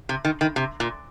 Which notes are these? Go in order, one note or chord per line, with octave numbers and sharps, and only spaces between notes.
C3
D#3
D#3
C3
A#2